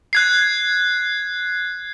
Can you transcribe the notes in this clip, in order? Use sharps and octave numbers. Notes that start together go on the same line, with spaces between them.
F#6 G#6 C7